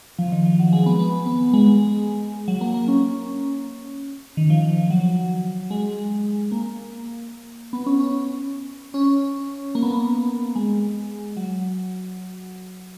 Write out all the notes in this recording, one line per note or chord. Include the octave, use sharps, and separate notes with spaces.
F3
D#3
F3
F#3
G#3
B3
B3
B3
B3
G#3
F#3
A#3
A#3
C#4
D#3
F3
F#3
G#3
A#3
B3
C#4
C#4
C#4
A#3
B3
A#3
G#3
F#3